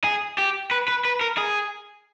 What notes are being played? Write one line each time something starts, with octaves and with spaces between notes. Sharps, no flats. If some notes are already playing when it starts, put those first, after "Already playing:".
G#4
G4
B4
B4
B4
A#4
G#4